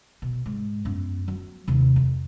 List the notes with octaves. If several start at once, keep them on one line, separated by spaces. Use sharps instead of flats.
B2
G#2
F#2 B3
F#3
D#2 C3
F2